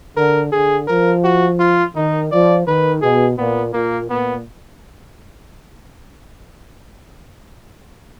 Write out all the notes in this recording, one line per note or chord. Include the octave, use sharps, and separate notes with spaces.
D3 A#4
D3 G#4
F3 A#4
F#4
F4
D#3 D#4
F3 D5
D#3 B4
B2 G#4
A#2 B3
A#2 A#3
A#2 B3